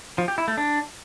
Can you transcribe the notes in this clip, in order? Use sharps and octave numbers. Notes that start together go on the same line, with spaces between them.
F3
G4
E4
A3
D4